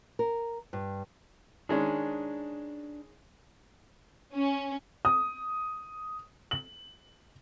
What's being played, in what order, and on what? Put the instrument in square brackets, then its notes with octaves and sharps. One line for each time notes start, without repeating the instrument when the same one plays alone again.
[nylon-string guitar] A#4
G2
[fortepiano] D#3 G#3 C#4 [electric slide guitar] D4
[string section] C#4
[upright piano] D#6
F#7